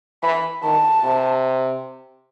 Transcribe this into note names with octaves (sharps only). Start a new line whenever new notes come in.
E3 B5
D#3 A5
C3